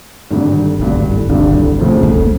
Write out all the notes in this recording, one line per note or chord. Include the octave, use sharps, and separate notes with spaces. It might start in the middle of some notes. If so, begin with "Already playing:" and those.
G#1 G2 D3
G#1 G2 D3 D#4
D#4
E4
G#1 G2 D3 D#4
E4
D2 C#3 F3 A3 C4
D#4
C#4